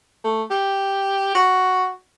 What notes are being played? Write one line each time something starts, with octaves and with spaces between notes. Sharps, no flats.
A3
G4
F#4